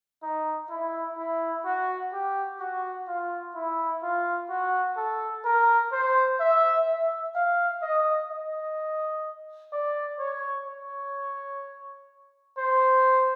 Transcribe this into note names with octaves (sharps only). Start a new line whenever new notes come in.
D#4
E4
E4
F#4
G4
F#4
F4
E4
F4
F#4
A4
A#4
C5
E5
E5
F5
D#5
D#5
D5
C#5
C#5
C5